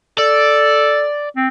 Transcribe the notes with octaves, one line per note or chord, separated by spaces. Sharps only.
A4 D5
C4